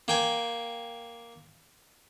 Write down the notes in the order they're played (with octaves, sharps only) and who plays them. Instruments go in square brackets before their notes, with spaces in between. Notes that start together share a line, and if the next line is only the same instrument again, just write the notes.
[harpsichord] A#3 G5 G#5